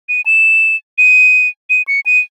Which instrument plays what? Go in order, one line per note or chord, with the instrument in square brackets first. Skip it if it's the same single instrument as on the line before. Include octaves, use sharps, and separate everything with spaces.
[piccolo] D#7
E7
D#7
D#7
C#7
D#7